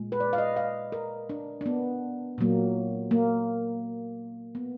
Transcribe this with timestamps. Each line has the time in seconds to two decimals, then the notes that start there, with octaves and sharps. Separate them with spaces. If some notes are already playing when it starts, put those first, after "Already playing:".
Already playing: A#2 G#3
0.12 B4
0.20 D5
0.33 F5
0.38 D#5
0.56 F5
0.92 A#4
1.30 D4
1.61 D4
1.66 B3
2.38 A#2 F#3 A#3
3.11 A#3
4.55 B3